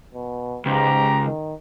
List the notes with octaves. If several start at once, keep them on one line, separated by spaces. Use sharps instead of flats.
B2
C#2 G#2 G4 A#5
D#3